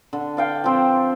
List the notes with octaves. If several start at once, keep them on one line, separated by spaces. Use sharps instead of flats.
D3
D5 F5 G5
F3 C4